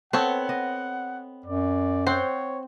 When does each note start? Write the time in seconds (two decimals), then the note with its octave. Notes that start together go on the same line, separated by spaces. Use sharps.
0.13 B3 C4 A4 C#5 F#5
0.49 D#5
1.46 F#2 D5
2.07 C4 C5 C#5 F#5